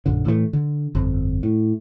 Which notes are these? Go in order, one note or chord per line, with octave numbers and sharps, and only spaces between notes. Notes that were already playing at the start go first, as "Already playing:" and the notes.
A#1 F#2 D3
A2 E3 F3 A3
D3
G1 F2
A2